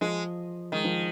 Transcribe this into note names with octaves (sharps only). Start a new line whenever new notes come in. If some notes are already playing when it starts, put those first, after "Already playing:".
F3 G#3
D#3 G#3
F3